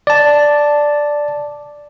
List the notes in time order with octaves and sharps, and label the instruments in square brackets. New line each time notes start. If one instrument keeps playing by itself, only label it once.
[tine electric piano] D5 A5